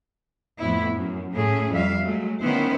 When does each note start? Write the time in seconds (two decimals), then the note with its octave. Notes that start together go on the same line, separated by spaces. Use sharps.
0.59 F2 A2 B3 E4
0.96 F#2
1.32 A2 A3 C#4 G#4
1.71 F2 G3 E5 F5
2.03 F#3 G#3 A3
2.42 D#3 B3 C#4 E4 C5